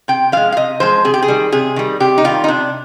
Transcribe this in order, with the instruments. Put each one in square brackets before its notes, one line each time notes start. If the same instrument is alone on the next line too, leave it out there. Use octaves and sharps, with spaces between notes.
[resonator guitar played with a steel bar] C3 G5
F3 G#3 F5
F5
C3 D#5
F3 G#3 C5
C3 G#4
G4
G#4
D#3 G3
C3 G#4
D#3 G3
C3 G4
D#4
D#3 G3 F4
D#4
C3 D4